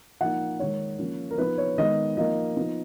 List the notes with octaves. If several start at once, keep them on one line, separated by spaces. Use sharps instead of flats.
F3 A#3 D#4 F#5
D#3 G#3 D#4 C#5
F3 A#3 C#4
A#4
F3 B3 D#4 B4
C#5
D#3 G#3 B3 D#4 D#5
F3 A#3 D#4 D#5
F3 B3 D#4